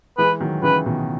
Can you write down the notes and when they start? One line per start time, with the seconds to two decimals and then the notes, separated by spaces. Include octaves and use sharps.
0.18 E3 G#3 B4
0.40 D#3 F#3
0.63 C#3 E3 B4
0.86 B2 D#3